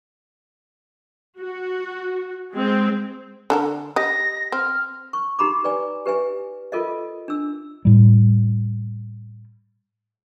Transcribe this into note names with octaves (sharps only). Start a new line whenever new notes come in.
F#4
G#3 C4
D3 A4 A#4
G4 D#5 A#6
C4 F6
C#6
D#4 G4 A#5 B5 D6
B4 D5 G#5
G4 B4 E5 G#5
F4 A4 A#4 D#5 E5
D4 E6
A2 G3